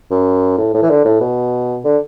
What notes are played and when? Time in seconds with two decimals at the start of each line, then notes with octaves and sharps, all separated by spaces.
0.11 F#2
0.58 A2
0.74 A2
0.82 E3
0.90 D3
1.05 A2
1.21 B2
1.85 D3